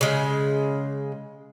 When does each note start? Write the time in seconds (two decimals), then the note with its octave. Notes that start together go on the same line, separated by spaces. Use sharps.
0.01 C#3 G#3